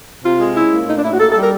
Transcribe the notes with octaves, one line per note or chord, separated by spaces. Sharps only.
C3 F4
G#3
C#4 E4
A#3
A2 D#4
D4
A2 E4
F#4
A#3 A4
A4
G3
A#4